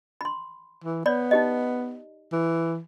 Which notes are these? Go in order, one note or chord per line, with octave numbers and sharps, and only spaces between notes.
B5 C6
E3
B3 C#5 D5 B5
D#4 G4 D#5
E3